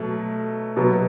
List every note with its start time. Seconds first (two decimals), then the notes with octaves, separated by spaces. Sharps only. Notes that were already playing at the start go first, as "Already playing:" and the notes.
Already playing: B2 F#3 A3
0.77 B2 F#3 B3